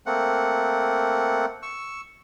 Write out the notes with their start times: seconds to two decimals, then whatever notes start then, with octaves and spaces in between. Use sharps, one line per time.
0.06 A3 A#3 C4 F#5
1.62 C#6 E6